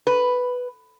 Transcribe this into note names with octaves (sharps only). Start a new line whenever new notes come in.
B4